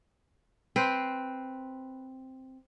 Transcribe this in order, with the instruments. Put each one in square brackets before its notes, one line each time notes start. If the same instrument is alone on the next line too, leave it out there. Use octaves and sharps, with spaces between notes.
[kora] C4 B4 C5